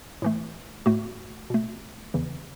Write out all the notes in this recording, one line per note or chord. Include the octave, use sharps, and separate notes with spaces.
A2 E3 A3
A2 A3 F#4
B2 A3
E2 C#3 E3